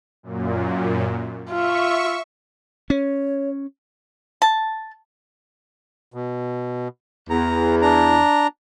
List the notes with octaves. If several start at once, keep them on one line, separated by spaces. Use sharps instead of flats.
F#2 A#2
F4 E5 C#6
C#4 C#5
A5
B2
E2 A#5
D4 A#5